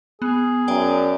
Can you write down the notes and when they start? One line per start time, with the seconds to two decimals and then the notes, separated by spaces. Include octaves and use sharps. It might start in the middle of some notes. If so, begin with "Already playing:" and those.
0.22 B3 G#4
0.68 F#2 D5 G5